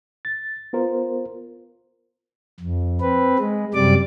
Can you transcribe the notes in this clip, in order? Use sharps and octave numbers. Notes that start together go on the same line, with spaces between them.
A6
B3 F4 A#4 C5
F2
C4 B4
G#3
F#2 C3 G3 D5 D6